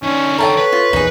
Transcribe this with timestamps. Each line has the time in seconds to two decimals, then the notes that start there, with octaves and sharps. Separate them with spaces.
0.03 D#3 C#4 D4
0.39 A4 C#5 E5 G5 A5 A#5
0.58 B4
0.73 F4
0.93 A#1 E2 A#2 D#4 G#4